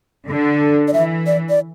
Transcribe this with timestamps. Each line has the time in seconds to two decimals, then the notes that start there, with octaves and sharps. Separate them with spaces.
0.28 D3
0.88 D5
0.93 E3 E5
1.27 D5
1.50 D5